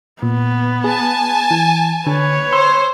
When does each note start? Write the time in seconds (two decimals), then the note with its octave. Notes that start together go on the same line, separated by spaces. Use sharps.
0.22 A#2 B3
0.84 G#4 G#5 A5
1.51 E3
2.06 D3 B4 C#5
2.53 C5 C6 E6